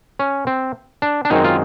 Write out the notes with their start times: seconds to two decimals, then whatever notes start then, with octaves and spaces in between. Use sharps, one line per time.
0.19 C#4
0.47 C4
1.02 D4
1.25 D4
1.30 F#2 D#3 G#3 C4 D#4
1.44 F4